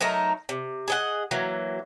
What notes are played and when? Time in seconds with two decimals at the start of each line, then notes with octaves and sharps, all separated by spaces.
0.01 F#3 A3 D#4 A#4
0.49 C3
0.88 G#4 D#5 F#5
1.31 E3 F#3 A#3